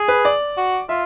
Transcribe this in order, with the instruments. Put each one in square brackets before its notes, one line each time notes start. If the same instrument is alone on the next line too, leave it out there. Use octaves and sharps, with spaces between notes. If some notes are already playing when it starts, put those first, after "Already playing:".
Already playing: [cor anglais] G#4
[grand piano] B4
D5
[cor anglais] F#4
[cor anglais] F4 [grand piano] E5